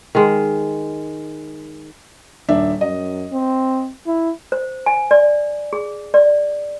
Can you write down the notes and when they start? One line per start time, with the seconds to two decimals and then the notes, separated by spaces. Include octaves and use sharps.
0.15 D#3 G#3
2.49 D#1 D4 E5
2.81 F#2 D#5
3.32 C4
4.07 E4
4.52 C5
4.86 G#5
5.11 D5
5.73 G#4
6.14 D5